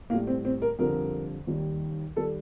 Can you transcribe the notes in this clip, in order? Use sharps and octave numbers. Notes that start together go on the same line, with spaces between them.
A2 G3 A#3
C4
C4
A#4
F2 D3 G3 A#4
D#2 D#3 G3
D#3 G3 A4